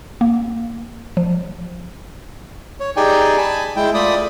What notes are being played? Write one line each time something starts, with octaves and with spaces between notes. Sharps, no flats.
A#3
F3
C#5
D#4 G4 G#4 D5 G5 G#5
G#5 A5 B5
G#3 E4 G5
A3 F4 D5 B5 D#6